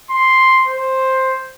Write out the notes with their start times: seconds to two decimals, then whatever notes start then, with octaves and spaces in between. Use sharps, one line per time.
0.10 C6
0.67 C5